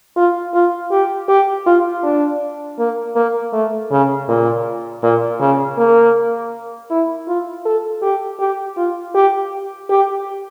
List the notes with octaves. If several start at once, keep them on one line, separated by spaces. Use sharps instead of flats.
F4
F4
G4
G4
F4
D4
A#3
A#3
A3
C#3
A#2
A#2
C#3
A#3
E4
F4
A4
G4
G4
F4
G4
G4